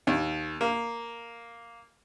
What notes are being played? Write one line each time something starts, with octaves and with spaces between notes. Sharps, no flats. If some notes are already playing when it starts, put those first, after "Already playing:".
D#2
A#3